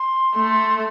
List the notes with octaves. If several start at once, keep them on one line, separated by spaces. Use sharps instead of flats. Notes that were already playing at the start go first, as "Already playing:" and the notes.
Already playing: C6
A3